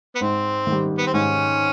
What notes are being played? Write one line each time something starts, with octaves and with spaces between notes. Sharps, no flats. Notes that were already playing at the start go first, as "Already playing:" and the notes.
B3
G#2 C4
D#3
G3
B3
C4
G#2 C#4